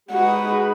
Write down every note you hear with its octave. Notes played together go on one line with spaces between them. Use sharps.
G#3 D#4 F#4 G#4 B4